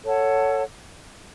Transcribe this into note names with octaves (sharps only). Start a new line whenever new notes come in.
A4 C#5 F#5 A5